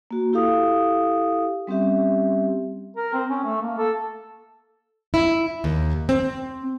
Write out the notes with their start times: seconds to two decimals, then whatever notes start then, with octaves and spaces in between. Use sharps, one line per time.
0.11 A#3 F#4
0.33 E4 G4 A4 F5 D#6
1.67 G3 C4 C#4 G4 E5
2.97 A#4
3.14 C4
3.30 C#4
3.44 A3
3.62 A#3
3.78 A4
5.14 E4
5.64 D#2
6.09 C4